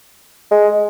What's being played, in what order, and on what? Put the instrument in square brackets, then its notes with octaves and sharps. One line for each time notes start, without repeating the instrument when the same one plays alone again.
[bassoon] G#3